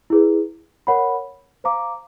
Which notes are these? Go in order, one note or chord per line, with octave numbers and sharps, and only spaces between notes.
E4 G#4 B4
A#4 C#5 F#5 B5
C5 F5 A#5 D6